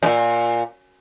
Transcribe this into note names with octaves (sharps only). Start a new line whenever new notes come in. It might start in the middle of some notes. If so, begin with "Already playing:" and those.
F#2 A#2